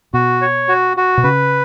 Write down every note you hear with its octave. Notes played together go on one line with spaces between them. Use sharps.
B2 F#4
C#5
F#4
F#4
B2
C#3 B4